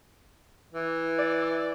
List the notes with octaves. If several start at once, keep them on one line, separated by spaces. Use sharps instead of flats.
E3
D5